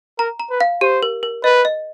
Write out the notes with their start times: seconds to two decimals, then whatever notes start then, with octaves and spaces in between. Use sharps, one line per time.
0.19 A#4 A#5
0.40 A#5
0.50 B4
0.61 F5
0.81 G4 C5
1.03 A#4
1.23 A#4
1.44 B4 D#5
1.65 D#5